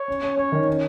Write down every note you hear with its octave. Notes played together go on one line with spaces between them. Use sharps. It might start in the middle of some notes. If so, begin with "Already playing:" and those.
Already playing: C#5
C#4
C#4
C#4 C#5
D#3
C#4